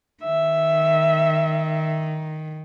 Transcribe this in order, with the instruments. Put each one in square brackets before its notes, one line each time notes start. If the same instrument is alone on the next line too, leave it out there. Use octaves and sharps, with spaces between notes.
[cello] D#3 [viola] E5